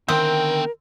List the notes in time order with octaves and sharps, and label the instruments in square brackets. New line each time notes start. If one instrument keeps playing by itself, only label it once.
[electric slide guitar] D3 D#3 E5 [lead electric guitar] B3 G5 [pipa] C4 [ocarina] A#4